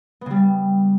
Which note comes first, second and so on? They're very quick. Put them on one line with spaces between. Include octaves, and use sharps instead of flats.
B3 C#3 G3